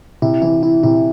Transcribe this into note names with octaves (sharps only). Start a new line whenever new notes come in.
C3 E4
E3 E4
E4
C3 E4